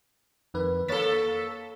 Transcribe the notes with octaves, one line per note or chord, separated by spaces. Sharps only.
F2 D#3 B4
A#3 A4 C#5 A6 B6